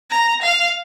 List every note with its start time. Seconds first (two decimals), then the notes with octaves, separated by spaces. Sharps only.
0.10 A#5
0.43 F5